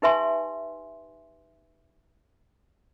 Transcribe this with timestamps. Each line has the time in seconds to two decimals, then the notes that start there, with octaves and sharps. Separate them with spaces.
0.02 D#4 G4 B4 E5 G#5 C6